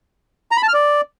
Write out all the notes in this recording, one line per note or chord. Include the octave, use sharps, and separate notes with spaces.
A#5
B5
A5
F6
D5